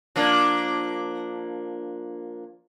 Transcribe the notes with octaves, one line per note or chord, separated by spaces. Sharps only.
F3 A#3 D4